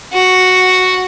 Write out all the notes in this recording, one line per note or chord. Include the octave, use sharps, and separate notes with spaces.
F#4